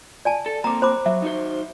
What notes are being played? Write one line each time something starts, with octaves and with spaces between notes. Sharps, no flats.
D5 G#5 A5
A4
A#3 C4 A#5 D6
C5 B5 D6
F#3 E5
D#4 F#4 C5